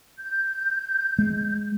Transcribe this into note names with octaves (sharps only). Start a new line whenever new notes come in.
G6
G#3